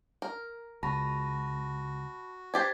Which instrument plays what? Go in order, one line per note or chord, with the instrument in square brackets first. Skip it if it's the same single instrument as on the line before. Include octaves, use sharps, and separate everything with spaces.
[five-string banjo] A#4
[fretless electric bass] C#2 [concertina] F#4 [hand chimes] A5 B5 A#6
[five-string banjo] D4 G4 C5 [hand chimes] G#6 A6 B6